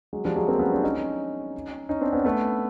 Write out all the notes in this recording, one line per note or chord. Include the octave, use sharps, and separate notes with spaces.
F#3 G#3
F3 G3
F#3 G#3
A#3 C4
B3 C#4
C4 D4
C#4 D#4
C#4 D#4
C4 D4
B3 C#4
A3 B3